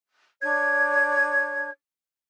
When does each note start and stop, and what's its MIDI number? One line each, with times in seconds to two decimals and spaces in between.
0.42 1.70 62
0.42 1.70 73
0.42 1.70 92